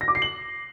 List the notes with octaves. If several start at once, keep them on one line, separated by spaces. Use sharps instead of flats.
A#6
D6
C7
F#7